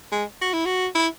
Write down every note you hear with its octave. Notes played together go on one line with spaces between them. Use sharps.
G#3
F#4
E4
F#4
E4